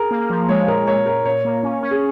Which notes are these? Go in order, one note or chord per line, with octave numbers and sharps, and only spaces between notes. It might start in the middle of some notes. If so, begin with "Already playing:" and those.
Already playing: G#4 A#4
A#3
F3
G#3 C#5
A#2 A#4
A#2 C#5
A#2 A#4
A#2 C#5
A#3
C#4
C#4
G#4